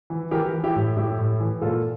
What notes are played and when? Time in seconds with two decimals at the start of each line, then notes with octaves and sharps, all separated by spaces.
0.10 E3
0.31 E3 G4 A#4
0.53 E3
0.64 E4 G4
0.76 A2
0.97 A2 E4 G4
1.18 A2
1.40 E3
1.62 A#2 F4 A4